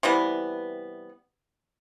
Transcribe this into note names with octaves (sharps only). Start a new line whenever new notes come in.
C3 E3 G3 B3